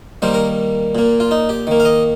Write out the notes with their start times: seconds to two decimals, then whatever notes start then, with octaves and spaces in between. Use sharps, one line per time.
0.22 D#3 G3 A#3 C5
0.34 A#4
0.95 A#2 A#3
1.20 F4
1.31 D#4
1.49 G4
1.67 D#3 A#3
1.80 F5
1.85 D#5